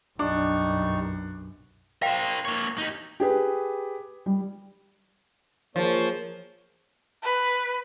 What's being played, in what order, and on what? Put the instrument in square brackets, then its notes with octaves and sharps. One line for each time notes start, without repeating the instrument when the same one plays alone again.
[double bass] B1 F#2 [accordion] G3 D#4 C#6 [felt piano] D4
[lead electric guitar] A#4 C5 [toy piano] F5 G5
[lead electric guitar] A#3 C#5
D#4 G4
[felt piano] G4 G#4 B4
G3
[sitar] F3 [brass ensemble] A#3 G#4 C#5
[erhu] B4